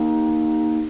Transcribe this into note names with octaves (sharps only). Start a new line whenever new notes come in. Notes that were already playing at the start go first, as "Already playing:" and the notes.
Already playing: A#3 D#4 G4